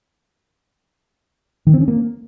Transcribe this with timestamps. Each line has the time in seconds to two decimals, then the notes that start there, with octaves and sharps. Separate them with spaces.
1.67 D#3
1.74 C4
1.81 C#4
1.88 A#3